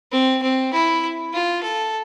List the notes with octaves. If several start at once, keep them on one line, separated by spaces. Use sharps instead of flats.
C4
C4
E4
F4
A4